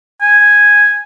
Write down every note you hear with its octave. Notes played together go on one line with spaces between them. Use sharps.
G#5